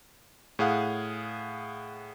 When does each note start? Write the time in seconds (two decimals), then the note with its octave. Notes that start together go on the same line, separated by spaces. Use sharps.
0.59 A2 G#4 F5 F#5